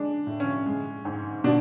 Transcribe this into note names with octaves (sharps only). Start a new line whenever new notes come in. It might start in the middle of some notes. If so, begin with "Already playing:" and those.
Already playing: G#3 D4
A2
C#4
G#3
G#2
B2 D4